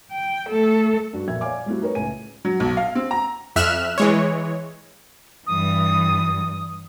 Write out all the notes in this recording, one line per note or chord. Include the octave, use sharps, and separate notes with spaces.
G5
A3 A4
G2 F#4
F2 A#2 E5 G#6
C#5 D5 F5 G#5 D6
G3 A3 C4 E4 F#4
D#4 A#4 B4 C#5
C#2 A2 G#5 D#7
F#3
B1
F5
C4
A#5
F2 E5 F6 F#6 E7
E3 G#3 C#5
G2 E3 D#6